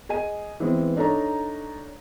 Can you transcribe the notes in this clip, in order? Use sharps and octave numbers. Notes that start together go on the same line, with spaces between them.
G#4 D#5 G#5 D#7
E3 G#3 B3 C4
D4 D#4 A4 C#5 A#5